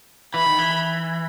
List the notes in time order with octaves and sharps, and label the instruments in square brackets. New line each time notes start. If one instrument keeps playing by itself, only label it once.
[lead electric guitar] E3 [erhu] B5
[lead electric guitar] D#3
E3